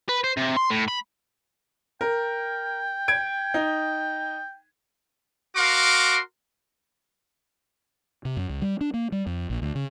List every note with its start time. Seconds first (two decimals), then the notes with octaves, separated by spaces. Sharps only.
0.09 B4
0.24 C5
0.37 C3
0.57 C6
0.71 A2
0.88 B5
2.01 A#4 G5
3.08 G#6 D7
3.54 D#4
5.56 F#4 A#4 F5 C6 D6
8.25 C3
8.37 F#2
8.49 C#2
8.62 G3
8.81 D4
8.94 A#3
9.12 G3
9.26 F2
9.50 A#1
9.62 D2
9.75 C#3